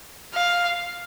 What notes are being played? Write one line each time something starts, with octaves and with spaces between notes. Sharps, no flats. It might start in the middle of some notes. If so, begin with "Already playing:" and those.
F5